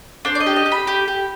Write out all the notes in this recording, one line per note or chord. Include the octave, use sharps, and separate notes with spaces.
D4 C5
D5
D#5
G4
D#5
G4
B5
G4
G4